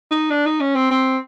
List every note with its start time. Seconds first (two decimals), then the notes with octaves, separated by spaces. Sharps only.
0.11 D#4
0.31 D4
0.46 D#4
0.61 C#4
0.75 C4
0.91 C4